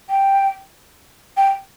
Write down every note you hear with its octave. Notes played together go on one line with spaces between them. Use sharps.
G5
G5